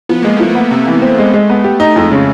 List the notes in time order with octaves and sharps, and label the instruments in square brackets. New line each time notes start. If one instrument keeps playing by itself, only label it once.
[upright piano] F3 [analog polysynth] B3
[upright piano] G#3 [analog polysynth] A#3
[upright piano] F3 [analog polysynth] A3
[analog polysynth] A#3
[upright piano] B3
[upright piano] C3 [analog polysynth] A3
[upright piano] E3
C4
G#3
G#3
B3
G4
D#4
[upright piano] F2 [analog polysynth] G#3
[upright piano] C#3